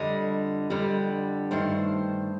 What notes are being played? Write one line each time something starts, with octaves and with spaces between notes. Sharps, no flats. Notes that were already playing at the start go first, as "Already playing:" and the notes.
Already playing: F2 D3 G3 D#5
F2 D3 G3
G2 D#3 A3 C5